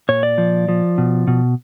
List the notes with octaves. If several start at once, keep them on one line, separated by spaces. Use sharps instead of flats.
A#2 C#5
D5
F3
F3
B2
B2